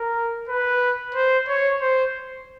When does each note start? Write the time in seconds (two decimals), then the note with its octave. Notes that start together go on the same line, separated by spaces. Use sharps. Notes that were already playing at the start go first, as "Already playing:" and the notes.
Already playing: A#4
0.49 B4
1.15 C5
1.48 C#5
1.81 C5